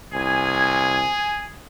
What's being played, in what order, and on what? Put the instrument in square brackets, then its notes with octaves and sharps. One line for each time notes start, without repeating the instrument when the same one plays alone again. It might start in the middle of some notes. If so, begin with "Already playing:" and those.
[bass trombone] C2 [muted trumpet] G#4 [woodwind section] G#5